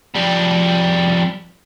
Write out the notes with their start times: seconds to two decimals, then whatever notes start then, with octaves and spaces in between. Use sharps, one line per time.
0.15 F2 G3